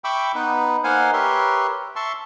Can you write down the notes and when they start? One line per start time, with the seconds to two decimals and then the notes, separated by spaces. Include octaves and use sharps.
0.04 E5 G5 B5 C#6 D6 E6
0.35 B3 D#4 B4
0.84 A#3 D#4 C5 F5 F#5 G#5
1.13 G4 A#4 B4 C#5 E5 C6
1.96 E5 A5 C6 C#6